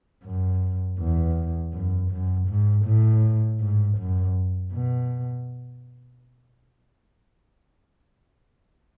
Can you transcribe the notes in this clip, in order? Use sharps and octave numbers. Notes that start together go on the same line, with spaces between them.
F#2
E2
F#2
F#2
G#2
A2
G#2
F#2
B2